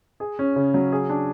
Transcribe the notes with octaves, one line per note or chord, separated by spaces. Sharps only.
G#4
C#4
C#3
F#3
G#4
D4